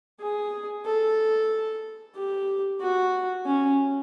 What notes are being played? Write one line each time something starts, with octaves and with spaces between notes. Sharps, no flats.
G#4
A4
G4
F#4
C#4